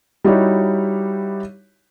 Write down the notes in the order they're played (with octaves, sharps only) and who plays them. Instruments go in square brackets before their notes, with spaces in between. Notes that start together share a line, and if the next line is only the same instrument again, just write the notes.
[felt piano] G3 D#4 E4 F#4 G4 C#5